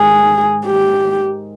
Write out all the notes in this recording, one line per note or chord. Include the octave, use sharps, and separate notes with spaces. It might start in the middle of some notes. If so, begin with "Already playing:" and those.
Already playing: G#2 D#3 G#3 G#4
G4